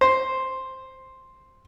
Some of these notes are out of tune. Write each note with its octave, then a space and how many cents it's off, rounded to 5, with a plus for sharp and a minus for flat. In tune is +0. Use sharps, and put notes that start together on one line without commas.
C5 +0